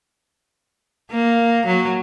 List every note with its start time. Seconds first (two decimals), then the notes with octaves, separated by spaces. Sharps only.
1.11 A#3
1.66 F#3